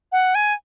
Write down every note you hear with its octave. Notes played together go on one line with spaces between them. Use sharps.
F#5
G#5